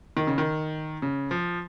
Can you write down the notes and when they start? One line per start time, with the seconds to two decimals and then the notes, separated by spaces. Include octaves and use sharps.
0.17 D#3
0.27 C#3
0.38 D#3
1.02 C#3
1.31 F3